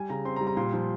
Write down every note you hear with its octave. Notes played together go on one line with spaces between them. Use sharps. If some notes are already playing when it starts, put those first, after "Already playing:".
Already playing: G3 G#5
C#3 A#5
C4 C6
A#5
G3
A#5
A#2 C6
F3